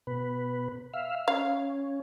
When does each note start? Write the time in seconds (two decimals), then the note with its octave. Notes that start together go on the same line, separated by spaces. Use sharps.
0.07 B2 B4
0.94 E5 F5
1.28 C#4 F5